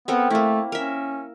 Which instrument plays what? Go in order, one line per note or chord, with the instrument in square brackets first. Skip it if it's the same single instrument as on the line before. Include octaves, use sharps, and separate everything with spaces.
[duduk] B3 [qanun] C4 A4 A#4
[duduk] A3 [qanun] A#3 E4
[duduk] C#4 [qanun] A#4 E5